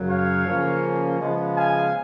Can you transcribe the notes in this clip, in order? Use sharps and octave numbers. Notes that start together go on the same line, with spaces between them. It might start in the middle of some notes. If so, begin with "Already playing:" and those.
Already playing: F#2 C#3 F#3
C#5 F5
C#3 F3 A#3 C#4
C#3 F3 G#3 B3
F5 G#5